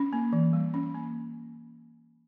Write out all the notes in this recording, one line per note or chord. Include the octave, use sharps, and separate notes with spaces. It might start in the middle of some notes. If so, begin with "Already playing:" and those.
Already playing: C#4
A#3
E3
G3
C#4
A#3